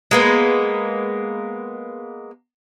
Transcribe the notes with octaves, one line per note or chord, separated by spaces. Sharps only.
G#3 A#3 B3